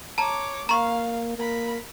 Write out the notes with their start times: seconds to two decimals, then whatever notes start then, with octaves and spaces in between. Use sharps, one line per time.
0.18 C#5 A5 A#5 D6
0.69 A#3 F5 A#5 C#6
1.37 A#3 A#4 B5